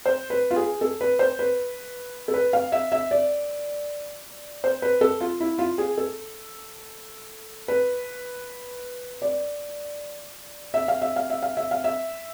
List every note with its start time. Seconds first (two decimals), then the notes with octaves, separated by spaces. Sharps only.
0.06 C5
0.30 B4
0.51 F4
0.56 G#4
0.81 A4
1.01 B4
1.19 C5
1.39 B4
2.28 A4
2.34 B4
2.53 F5
2.72 E5
2.92 E5
3.11 D5
4.64 C5
4.82 B4
5.01 A4
5.21 F4
5.40 E4
5.59 F4
5.78 G#4
5.98 A4
7.68 B4
9.22 D5
10.74 E5
10.88 F5
11.02 E5
11.16 F5
11.30 E5
11.43 F5
11.57 E5
11.71 F5
11.84 E5